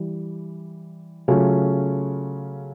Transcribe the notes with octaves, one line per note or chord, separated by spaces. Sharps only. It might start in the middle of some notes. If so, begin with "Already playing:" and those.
Already playing: E3 G3
C#3 F#3 A3 C#4 F4